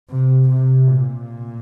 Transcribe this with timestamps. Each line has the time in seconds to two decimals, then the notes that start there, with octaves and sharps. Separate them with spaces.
0.10 C3
0.49 C3
0.87 A#2